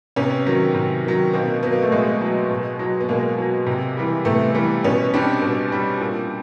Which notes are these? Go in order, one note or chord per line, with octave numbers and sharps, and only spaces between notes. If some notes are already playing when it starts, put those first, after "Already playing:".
C3 B3 C#4
D#3 F#3
C3
D#3 F#3
B2 A#3 C4
F#3 B3
A#3
A3
B2 G#3
F#3
B2
F#3
B3
B2 G#3 A#3
F#3
C3
E3 G3
C3 A3 B3
E3 G3
B2 B3 C#4
G3 C4 D4
B2
G3
A#2